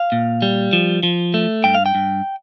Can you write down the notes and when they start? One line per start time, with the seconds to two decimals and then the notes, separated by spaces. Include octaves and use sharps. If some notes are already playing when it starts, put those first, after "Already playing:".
Already playing: F5
0.12 A#2
0.42 G3
0.73 F3
1.03 F3
1.34 A3
1.64 G2 G5
1.75 F5
1.86 G5
1.95 G2